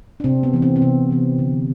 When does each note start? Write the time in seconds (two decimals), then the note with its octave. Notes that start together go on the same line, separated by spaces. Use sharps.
0.20 D4
0.24 C3 C4
0.43 B3
0.53 E3 B3
0.62 C4
0.76 C4
0.82 C3 B3
1.10 E3 B3
1.39 D3